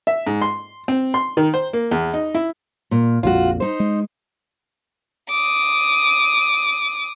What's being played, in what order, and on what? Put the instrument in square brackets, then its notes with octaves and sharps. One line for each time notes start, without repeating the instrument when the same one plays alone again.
[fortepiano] E5
G#2
C6
C4
C6
D#3
C5
A#3
E2
D#4
E4
[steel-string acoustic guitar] A#2
[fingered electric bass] A#1 F2 A#2 [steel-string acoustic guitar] F4 F#4
[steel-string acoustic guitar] D#4 C5
[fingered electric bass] G#3
[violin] D6 D#6